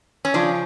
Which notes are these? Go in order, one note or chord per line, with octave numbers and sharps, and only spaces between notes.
C#4
C#3 F3 D4